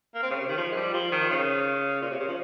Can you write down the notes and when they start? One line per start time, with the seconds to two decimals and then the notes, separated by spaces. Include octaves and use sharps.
0.15 A#3
0.23 C4
0.31 C#3
0.40 C3
0.49 D#3
0.57 F3
0.72 G#3
0.76 G3
0.94 F3
1.12 D#3
1.30 C#3
2.02 A#2
2.11 C3
2.20 C#3
2.28 F3